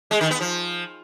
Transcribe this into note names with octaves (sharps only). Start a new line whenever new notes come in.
G#3
D#3
B3
F3